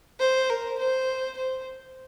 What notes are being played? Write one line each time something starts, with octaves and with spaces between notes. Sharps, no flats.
C5
A#4
C5
C5